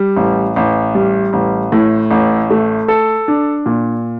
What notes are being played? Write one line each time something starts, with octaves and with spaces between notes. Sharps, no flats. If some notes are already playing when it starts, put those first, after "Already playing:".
Already playing: G3
A1
A1
G3
A1
A2
A1
A3
A4
D4
A#2